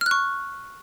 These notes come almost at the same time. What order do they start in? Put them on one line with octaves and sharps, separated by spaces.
F6 F#6 C#6